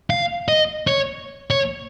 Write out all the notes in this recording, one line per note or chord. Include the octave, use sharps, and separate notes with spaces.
F5
D#5
C#5
C#5